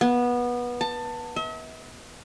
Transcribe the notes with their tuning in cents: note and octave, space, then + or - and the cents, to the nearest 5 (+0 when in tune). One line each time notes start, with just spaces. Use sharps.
B3 -20
A5 +20
E5 -45